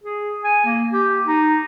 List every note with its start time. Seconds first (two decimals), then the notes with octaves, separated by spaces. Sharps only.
0.04 G#4
0.44 G#5
0.65 A#3
0.93 G4
1.27 D#4